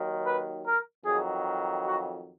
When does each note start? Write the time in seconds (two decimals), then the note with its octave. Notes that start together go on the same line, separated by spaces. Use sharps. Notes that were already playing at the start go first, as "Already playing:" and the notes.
Already playing: D#2 D#3 F#3
0.25 B4
0.66 A#4
1.05 F2 D#3 F#3 G#4
1.85 F#4